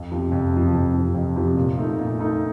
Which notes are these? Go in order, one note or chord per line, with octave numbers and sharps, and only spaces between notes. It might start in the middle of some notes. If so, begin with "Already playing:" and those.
Already playing: F2
C3 F3
F2
C3 F3
F2
C3 F3
F2
C3 F3
A#2
A3 D#4
A#2
A3 D#4